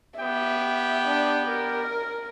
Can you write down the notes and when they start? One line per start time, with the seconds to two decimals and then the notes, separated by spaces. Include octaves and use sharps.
0.19 B3 G4 E5 G5
1.08 D4
1.48 A#4